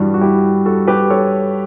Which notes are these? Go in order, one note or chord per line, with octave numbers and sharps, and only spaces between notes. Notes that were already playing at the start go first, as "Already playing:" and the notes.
Already playing: G2 E3 G3 D4 F#4
F#4
E4 G4
F#4 A4
G4 B4
A4 C#5